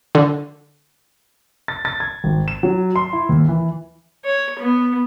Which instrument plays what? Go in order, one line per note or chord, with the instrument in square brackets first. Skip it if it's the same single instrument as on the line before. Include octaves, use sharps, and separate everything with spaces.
[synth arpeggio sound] D3
[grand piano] A6
A6
G#6
G#1
E7
F#3
C6
E4
D#2
E3
[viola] C#5
B3